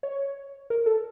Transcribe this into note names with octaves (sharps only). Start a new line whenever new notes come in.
C#5
A#4
A4